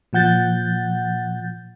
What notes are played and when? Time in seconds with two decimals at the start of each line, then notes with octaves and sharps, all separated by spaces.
0.13 A#2 F3 F#5 G6 A6